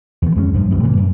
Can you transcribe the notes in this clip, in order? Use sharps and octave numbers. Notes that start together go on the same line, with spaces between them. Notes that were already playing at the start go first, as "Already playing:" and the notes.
E2 D#3
F2 G#3 B3 C#4
A#1 G2 F3
C2 F#2 B2 D#3
A2 C3 E3 A#3
F#2